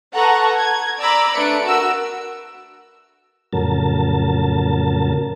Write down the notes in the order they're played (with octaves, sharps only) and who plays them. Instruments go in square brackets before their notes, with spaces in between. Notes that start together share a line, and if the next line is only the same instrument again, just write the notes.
[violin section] A4 B4 F#5 A5 A#5 C#6
G#6
D5 A#5 B5 D6 E6
A3 D4 B4 C#7 D7
F#4 A#4 E6
[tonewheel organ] F2 A2 C#3 F#3 A#4 A5